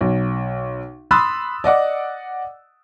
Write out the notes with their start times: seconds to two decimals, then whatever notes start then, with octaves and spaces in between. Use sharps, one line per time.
0.01 B1
1.11 B5 C6 D#6 E6 F#6 A6
1.64 D5 D#5 F#5 D6